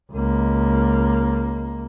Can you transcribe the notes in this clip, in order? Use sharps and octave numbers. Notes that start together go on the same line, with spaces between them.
C#2 A#3